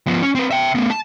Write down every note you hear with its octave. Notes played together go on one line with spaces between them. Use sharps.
F3 B3
C#4
C4 B4
E5 G5
A3 B3
A5